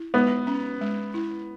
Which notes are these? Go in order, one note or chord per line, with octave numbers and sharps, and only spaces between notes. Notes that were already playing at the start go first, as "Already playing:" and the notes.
Already playing: E4
G#3 B3
C#4
G#3
E4